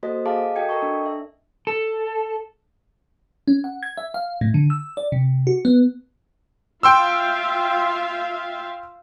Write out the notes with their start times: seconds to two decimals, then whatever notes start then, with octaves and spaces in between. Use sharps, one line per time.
0.03 A#3 F#4 A4 C5 D#5
0.26 G#4 D#5 F5 A5 D6
0.56 F#4 A4 D#5 G5 G#6 C#7
0.69 A4 A#4 D#5 G5 A5 C#6
0.82 D4
1.06 E5
1.67 A4
3.48 C#4
3.64 F#5
3.83 G#6
3.98 E5
4.14 F5
4.41 A2
4.54 D3
4.70 E6
4.97 D5
5.12 C3
5.47 F#4
5.65 B3
6.83 F4 E5 F5 G5 C6 E6